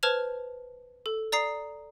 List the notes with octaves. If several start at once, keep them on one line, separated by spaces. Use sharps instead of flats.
B4 C5 A5 F6 G#6 F7
A4
D5 A#5 D#6 C7